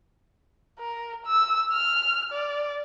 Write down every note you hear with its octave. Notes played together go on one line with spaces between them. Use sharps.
A#4
E6
F6
D5